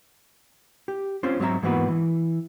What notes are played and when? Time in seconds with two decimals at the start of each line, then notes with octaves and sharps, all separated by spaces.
0.88 G4
1.23 C4 C#4 F4 C5
1.40 G#2 F#3 C4 D4 E5 A#5
1.63 G#2 E3 A#3 B3 F#4 B4
1.89 E3